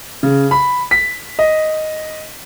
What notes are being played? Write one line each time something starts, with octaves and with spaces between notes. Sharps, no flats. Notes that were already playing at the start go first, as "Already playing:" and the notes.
C#3
B5
B6
D#5